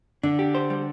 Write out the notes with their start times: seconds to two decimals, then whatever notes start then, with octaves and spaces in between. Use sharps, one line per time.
0.23 D3 D4
0.39 G4
0.55 C5
0.70 G3